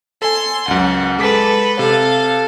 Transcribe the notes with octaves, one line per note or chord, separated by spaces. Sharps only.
A4 G#5 C6
C#2 F#2 F#5
G#3 A4 B4 D6 B6
C3 A4 F5